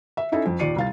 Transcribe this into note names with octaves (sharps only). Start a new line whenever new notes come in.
E5
C#4 D#4 E4 A4 E5
F2
D#2 A#2 D5 C7 C#7 D#7
C2 F5 A6